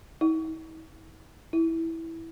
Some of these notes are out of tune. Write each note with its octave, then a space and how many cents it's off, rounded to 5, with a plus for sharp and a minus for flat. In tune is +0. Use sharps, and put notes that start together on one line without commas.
E4 -45
E4 -10